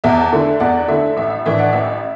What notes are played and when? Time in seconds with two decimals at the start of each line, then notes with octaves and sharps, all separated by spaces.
0.04 E2 E5 A5
0.33 D3 A3 E4
0.60 E2 D5 F#5
0.88 D3 A3 E4 E5
1.17 A1 E5
1.30 E5
1.45 A2 E3 D4 E5
1.58 D5 F#5
1.73 A1 E5